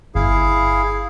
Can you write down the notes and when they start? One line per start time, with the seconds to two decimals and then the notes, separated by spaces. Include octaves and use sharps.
0.15 G1 E4 G#4 F5